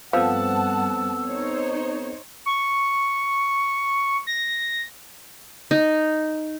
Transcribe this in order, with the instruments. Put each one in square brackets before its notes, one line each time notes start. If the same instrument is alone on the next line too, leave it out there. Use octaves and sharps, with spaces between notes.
[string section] G2 F#5 A5 [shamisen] F3 [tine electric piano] B3 C4 A4 [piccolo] E6
[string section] D#4 C5 C#5
[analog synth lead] C#6
A#6
[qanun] D#4